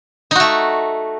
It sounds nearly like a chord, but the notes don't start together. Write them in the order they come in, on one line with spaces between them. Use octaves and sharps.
D#4 F#4 A3